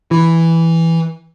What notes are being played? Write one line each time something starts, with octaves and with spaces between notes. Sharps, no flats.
E3